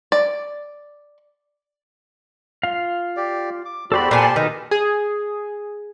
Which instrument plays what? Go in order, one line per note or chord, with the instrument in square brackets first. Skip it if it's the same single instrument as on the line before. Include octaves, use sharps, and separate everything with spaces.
[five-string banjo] D5
[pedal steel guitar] F4 F5
[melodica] G4 D5
D6
[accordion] E2 F#4 D5 [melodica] G4 [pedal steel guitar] A4 C5 B5
[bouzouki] A#2 G#5 [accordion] D5 A5 C6
[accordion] B2 [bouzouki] D#3 [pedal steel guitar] D#4 A4 B4
[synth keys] G#4